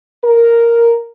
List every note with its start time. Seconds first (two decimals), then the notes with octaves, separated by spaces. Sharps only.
0.24 A#4